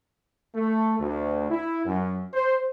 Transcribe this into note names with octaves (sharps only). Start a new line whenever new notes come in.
A3
D2
E4
F#2
C5